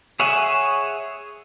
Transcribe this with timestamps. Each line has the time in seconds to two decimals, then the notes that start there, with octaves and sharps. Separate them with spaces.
0.20 G#4 C#5 E5 F#5 G#5